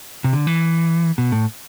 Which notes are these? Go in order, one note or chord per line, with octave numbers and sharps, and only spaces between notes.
C3
D3
E3
B2
A2